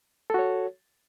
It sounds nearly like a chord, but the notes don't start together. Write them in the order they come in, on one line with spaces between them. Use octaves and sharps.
A4 F#4 C#5